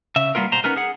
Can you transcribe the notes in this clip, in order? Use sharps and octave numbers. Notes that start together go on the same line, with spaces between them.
C#3 E5
G3 A#3 B3 F4 A#4
B2 C5 A#5
B3 C#4 D#4 A#4 B4
G#4 F#5